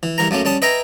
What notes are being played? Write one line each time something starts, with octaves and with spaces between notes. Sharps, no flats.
E3
G2 E3 A#4 A#5
F#2 A3 A#3 C#4
G3 C#4 A5 D#6
B4 D#5 E5 G5 G#5 A#5